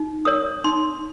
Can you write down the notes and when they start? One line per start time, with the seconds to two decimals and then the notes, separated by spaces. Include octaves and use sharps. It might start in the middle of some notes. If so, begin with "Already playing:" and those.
Already playing: D#4
0.25 A#4 C#5 D#6
0.64 D#4 C6